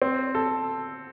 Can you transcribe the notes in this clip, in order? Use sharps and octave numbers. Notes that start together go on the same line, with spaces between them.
C4
A4